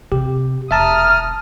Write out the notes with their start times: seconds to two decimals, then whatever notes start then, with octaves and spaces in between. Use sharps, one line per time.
0.12 C3 G4
0.71 E1 E5 A5 A#5 D#6 F6